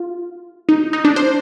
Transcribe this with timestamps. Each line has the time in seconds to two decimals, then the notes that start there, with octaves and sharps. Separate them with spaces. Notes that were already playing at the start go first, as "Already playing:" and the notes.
Already playing: F4
0.69 D#4
0.93 D#4
1.05 D4
1.16 C5